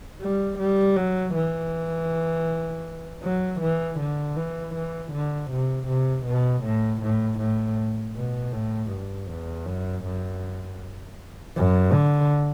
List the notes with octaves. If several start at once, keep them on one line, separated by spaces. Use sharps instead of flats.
G3
G3
F#3
E3
F#3
E3
D3
E3
E3
D3
C3
C3
B2
A2
A2
A2
B2
A2
G2
E2
F#2
F#2
F#2
D3